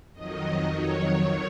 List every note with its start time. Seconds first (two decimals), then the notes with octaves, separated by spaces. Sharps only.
0.14 F2 D#3 F#3 D#5
0.67 F2 D#3 F#3 C#5